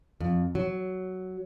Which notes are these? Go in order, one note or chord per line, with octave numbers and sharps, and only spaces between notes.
F2
F#3